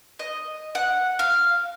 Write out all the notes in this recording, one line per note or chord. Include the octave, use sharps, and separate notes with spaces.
D#5
F#5
F5